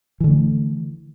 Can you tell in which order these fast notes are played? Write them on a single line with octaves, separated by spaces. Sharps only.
E3 D3 A3